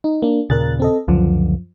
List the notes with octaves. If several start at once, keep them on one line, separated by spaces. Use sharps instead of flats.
D#4
A#3 D4
D#2 A#2 C#3 A#4 F#6 A6
C4 A4 D#5
C#2 F#2 D3 F3